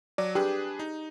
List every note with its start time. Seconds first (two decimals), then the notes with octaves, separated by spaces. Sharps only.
0.18 F#3 D5
0.35 D4 G4 G#4 B4
0.79 D#4